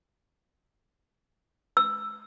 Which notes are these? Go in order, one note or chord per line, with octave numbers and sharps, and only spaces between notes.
E6